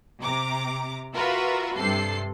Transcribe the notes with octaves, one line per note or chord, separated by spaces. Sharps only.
C3 A#5 D6
F4 F#4 A#4 B4 E5
G2 C3 A4 C7